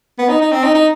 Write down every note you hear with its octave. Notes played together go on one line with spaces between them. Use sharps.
B3
D#4
D#4
C4
D#4
D#4